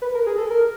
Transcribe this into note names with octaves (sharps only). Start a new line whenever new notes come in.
B4
A#4
G#4
A4
A#4